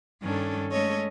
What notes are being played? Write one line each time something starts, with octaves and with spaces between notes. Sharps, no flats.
G2 D#3 C#4 D4 A4
G#3 A3 C#4 A4 C#5 D#5